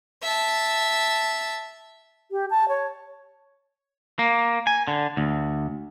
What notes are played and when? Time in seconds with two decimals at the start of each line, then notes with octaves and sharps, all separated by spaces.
0.22 E5 A5
2.31 G4
2.50 A5
2.69 C#5
4.19 A#3
4.67 G#5
4.88 D3
5.17 D2